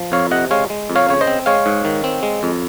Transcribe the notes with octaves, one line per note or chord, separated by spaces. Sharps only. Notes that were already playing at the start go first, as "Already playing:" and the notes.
Already playing: F3
F2 C#5 F5
C3 D#5 F#5
G#3 C#5 F5
G#3
F2
C#5 F5
C#3 C#5
C5 D#5
C4
G#3 C#5 F5
G#2
D#3
C4
G#3
F2